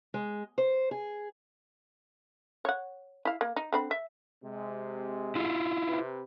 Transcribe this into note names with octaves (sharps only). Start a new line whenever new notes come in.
G#3
C5
G#4
C#5 F#5
E4 F5
A#3
D#4
D3 C4 B5
E5
C3 G#3
E4 F4
C3 B4